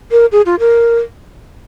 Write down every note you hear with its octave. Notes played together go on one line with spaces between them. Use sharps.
A#4
G#4
F4
A#4